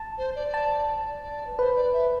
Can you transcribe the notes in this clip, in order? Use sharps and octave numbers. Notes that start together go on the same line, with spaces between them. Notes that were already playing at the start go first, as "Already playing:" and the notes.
Already playing: A5
C5
D5
A5
D5
B4
B4 C5
D5
E5